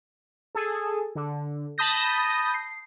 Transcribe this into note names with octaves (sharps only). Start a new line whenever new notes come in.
G#4 A4
D3
A5 B5 D#6 G6 A#6
C7